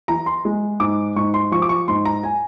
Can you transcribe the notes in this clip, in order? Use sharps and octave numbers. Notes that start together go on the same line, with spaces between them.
E3 A#5
C6
G#3
G#2 D6
G#2 C#6
C6
F3 C#6
D6
C#6
G#2 C6
A#5
G#5